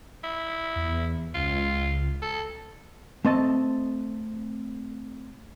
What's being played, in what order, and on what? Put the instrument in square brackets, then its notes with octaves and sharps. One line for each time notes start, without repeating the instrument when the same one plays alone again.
[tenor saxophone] E4
[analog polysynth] E2
[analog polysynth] C#2 [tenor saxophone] F4
[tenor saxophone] A4
[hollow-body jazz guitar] A3 C4 D#5 A5